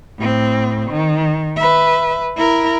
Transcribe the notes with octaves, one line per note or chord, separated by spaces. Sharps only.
A2 C4
D#3
B4 E5
E4 A#4